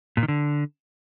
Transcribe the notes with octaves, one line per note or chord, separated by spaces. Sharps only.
A#2
D#3
D3